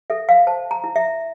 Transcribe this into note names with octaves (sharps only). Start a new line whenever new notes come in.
A4 E5
F5
C5 A5
A#5
E4
E5